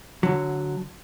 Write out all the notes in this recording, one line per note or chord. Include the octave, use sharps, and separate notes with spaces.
D3 F#3